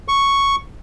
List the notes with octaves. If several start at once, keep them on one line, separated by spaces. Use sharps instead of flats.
C#6